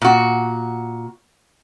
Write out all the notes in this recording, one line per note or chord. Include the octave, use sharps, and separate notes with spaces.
A#2 F#4